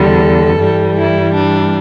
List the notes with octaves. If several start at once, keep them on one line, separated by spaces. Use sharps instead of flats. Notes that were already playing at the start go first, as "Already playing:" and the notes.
Already playing: E2 D3 G3 A4
G2 E3 G3
E4
D4